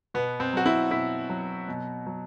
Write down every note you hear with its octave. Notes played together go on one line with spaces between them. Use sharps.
B2 B3
C4
F#3 F#4
E4
B2 E4
F#3
B2
F#3